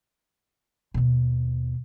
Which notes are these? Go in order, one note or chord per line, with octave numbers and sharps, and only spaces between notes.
D#2 B2